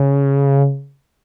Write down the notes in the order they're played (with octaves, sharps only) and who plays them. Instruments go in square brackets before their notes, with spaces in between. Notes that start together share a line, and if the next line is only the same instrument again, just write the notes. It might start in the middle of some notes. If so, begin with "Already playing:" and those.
Already playing: [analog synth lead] C#3